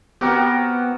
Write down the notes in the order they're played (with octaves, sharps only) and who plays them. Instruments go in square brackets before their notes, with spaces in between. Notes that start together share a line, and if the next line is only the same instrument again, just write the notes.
[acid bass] B3 [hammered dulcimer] C4 F#4 A#4 [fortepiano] G4 F#5